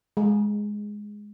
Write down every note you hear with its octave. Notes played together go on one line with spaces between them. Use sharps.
G#3